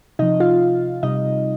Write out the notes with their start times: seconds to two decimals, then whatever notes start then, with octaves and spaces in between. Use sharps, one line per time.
0.19 C3 F3 D#4 D#5
0.40 F4 F5
1.03 C3 G3 D#4 D#5